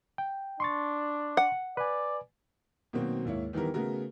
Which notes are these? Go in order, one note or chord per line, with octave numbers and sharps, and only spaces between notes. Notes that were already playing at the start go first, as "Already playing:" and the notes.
G5
D4 C6 C#6 A6
F#5
B4 D5 G#5
B2 D#3 F#3 A#3 C4
D#2 G#2 A#3 E4 C#5
D#3 E3 G3 B3 A#4
C#3 A3 B3 F#4 A#4